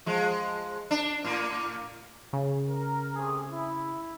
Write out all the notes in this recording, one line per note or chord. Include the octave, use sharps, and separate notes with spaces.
F3 G#3
D4
A2 A#3
C#3
A#4
C3 A3 G#4
E4